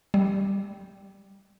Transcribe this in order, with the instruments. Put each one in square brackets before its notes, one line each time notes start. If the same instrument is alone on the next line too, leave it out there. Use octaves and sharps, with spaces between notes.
[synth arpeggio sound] G3